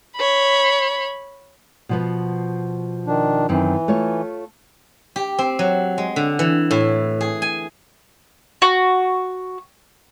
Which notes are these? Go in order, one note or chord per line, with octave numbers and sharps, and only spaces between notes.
C#5 B5
B2 F3 B3
D#3 D4
F#2 D#3 E3 C4
A3 F4 C#5
G4
C4
F#3
G#3
D3
E3
A2
G#4
G#5
F#4